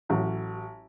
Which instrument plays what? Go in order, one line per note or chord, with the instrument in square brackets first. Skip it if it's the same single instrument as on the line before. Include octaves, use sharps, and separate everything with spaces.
[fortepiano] A1 F#3